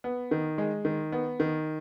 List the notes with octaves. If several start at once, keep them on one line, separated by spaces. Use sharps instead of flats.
B3
D#3
G#3
D#3
B3
D#3